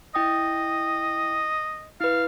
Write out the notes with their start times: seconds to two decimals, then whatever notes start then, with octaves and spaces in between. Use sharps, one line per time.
0.15 E4 D#5 G5 D#6
2.00 E4 B4 F5